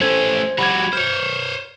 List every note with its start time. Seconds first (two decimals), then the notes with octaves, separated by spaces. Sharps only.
0.01 A3 C#4 C5 G#6
0.58 G3 F#4 B5 G#6
0.93 C5 C#5 F6